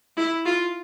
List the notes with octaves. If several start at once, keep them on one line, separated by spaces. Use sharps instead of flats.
E4
F4